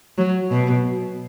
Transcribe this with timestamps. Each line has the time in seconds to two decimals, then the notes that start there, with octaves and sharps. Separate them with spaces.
0.18 F#3
0.51 B2